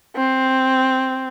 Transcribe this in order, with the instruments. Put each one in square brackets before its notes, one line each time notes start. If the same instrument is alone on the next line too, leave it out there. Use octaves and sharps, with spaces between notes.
[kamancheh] C4